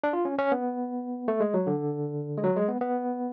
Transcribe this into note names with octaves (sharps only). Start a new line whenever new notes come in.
D4
F4
C#4
C#4
B3
A3
G#3
F#3
D3
G#3
F#3
G#3
B3
B3